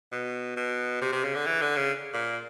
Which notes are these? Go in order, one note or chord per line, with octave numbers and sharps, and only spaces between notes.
B2
B2
C3
C3
C#3
D3
E3
D3
C#3
A#2